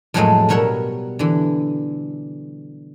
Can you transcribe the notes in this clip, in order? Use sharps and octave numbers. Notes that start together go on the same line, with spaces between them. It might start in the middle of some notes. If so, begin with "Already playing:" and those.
F2 A2 F#3 G#3 A3 D#5
B2 G3 A#4 C#5 E5 F#5
D3 E3